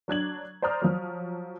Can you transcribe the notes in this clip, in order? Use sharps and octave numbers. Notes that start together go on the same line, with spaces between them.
F#3 D4 G#6 F#7
C5 D5 A#5 D#6 F6
F3 F#3